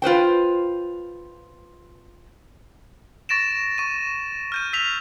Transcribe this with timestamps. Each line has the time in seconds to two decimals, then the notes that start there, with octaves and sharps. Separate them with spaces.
0.02 F4 B4 C5 G5
3.29 C#6 A6 A#6 D7 E7
3.78 C#6 D#7
4.52 F6 G6 D#7
4.73 E6 B6 F7